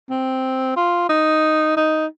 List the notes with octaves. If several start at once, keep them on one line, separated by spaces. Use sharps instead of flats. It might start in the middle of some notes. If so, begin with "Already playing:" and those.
C4
F4
D#4
D#4